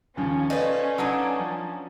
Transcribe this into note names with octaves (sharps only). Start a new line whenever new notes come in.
D#2 C#3 F3 C#4
A3 B4 C5 D5 D#5 F5
F#3 D4 D#4
F3